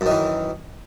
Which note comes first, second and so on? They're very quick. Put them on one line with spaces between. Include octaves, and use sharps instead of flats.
F#2 D#3 E3